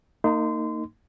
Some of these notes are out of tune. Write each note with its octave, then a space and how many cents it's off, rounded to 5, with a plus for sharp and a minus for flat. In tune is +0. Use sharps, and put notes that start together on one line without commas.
A#3 -30 D#4 +0 C6 -25